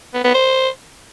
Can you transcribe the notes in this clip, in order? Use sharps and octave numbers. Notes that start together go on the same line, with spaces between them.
B3
B3
C5